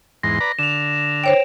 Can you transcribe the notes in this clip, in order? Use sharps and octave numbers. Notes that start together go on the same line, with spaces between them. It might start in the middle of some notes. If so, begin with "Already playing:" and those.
E2 G#2 C6 A#6
B4 D5 A#5
D3 E7 F7
C5 C#5 G5 D7